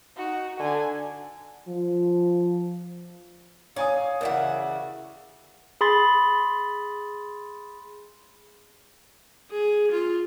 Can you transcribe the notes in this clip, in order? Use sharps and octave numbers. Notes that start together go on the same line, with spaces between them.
D#4 F#4
D3 G#5
F3
C#5 D5 F5 G#5 D#6
C#3 E3 F#4 A#4 D5 E5
G#4 B5 C6 A6
G#4
F4